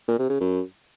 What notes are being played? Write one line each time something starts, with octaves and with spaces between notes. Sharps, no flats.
A#2
C3
C#3
F#2